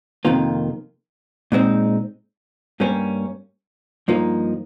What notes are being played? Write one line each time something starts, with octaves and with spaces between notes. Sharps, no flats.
F2 C3 D#3 A#3 F4
A#2 G#3 C4 D#4
G2 G3 A#3 C#4
G2 F3 A#3 D#4